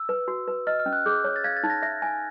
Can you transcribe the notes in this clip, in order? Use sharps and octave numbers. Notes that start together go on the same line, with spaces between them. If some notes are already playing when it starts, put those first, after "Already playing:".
Already playing: E6
B4
F#4
B4
D#5 F6
F6
C#4
F#6
G#4 G6
C#5
A6
F5 G#6
A6
D#4
A#6
E5
G#5